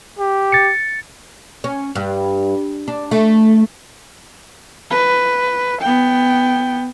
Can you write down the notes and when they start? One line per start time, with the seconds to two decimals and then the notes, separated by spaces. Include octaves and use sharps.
0.19 G4
0.52 A6 C#7
1.64 C#4
1.95 G2
2.88 D4
3.11 A3
4.91 B4
5.81 B3 G5